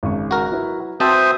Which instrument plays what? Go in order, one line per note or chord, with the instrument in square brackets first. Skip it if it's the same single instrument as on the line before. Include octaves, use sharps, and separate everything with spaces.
[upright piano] G#1 C#3 C#6
[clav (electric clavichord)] F#4 A#4
[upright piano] F#3 E4 B4
[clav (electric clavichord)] C4 A5 [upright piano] F#4 B4 C#6 [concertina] C5 E5 D#6